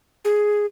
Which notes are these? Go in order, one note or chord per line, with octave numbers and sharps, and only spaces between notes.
G#4